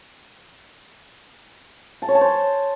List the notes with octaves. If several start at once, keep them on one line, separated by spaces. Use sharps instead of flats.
A5
C#5
A5
C5